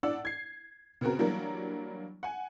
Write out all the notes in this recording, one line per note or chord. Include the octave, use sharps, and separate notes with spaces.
A2 D4 D5 F#5 E6
G#6 C7
C#3 B3 C4 F#4 A#4
E3 F#3 G3 A#3 D4 A#4
F#5 G#5